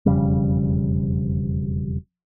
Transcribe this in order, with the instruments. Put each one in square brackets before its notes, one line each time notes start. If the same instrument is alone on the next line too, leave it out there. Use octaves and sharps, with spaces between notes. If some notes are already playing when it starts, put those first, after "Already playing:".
[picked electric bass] E1 F2 C#3 G3